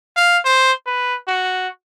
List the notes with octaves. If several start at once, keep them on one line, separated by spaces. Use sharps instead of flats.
F5
C5
B4
F#4